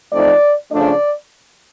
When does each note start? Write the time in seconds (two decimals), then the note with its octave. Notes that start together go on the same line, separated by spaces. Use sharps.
0.13 F3 A3 C4 D#4 D5
0.71 C#3 F3 A3 D4 D5